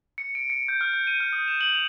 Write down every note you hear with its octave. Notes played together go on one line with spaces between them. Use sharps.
C#7
D7
C#7
G6
F6
G6
D#7
F6
D#6
E7
F#7
F7